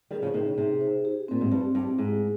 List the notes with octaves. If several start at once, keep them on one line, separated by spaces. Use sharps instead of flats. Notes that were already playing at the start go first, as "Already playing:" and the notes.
D#3 G3 G#4
C#3 F3
C3 D#3 D#4
C#3
C3 G#4
C5
G4
A#2 C4
G#2
G2 G4
G2 G4
G#2 G#4